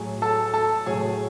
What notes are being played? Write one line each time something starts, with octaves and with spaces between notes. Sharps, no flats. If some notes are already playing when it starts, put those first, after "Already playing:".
Already playing: A2 F#3 G#4 G#5
A4 A5
A4 A5
A2 F#3 G#4 G#5